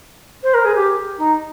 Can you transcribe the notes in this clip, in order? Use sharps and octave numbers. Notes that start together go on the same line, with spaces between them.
C5
A#4
G#4
G4
D#4